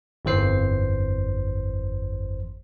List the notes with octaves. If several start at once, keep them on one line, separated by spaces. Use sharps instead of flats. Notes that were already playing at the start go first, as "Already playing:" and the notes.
G1 F2 E3 C5 C7